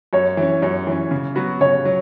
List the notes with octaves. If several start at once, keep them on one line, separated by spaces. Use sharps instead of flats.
F#2 C#5
E3
C#4
F#2 C#5
E3 C#4
C#3
F#3 B3 F#4
C#3 C#5
F#3